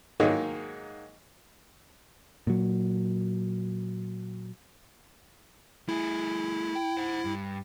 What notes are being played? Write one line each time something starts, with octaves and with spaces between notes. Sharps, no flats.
G#2 D#3 F#3 G#3 A#3 G#4
A#2 F#3
A3 E4 G#4
G5
C5 F#5
G2